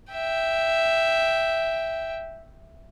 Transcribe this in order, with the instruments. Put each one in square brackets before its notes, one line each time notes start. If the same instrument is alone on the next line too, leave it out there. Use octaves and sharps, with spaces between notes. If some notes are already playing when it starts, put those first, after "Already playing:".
[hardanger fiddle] E5 G5